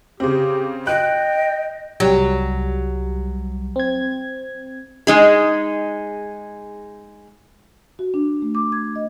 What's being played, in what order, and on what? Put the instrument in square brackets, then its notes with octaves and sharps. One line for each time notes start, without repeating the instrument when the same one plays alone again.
[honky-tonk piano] C#3 C4 [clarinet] G4
[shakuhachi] D#5 [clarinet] G5 [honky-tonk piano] F#6
[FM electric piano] C2 G3 [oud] F#3
[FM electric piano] C4 G#6
[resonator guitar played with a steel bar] G#3 D#4 G#4
[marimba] F#4
D4
A3
D6
G#6
D#5